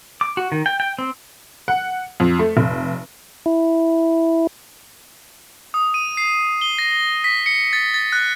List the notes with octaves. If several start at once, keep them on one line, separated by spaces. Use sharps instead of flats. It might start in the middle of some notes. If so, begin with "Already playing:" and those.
D6
F#4
D#3
G5
G5
C4
F#5
F2
A3
F1
E4
D#6
D#7
C7
G7
A#6
B6
C#7
A6
A6
F#6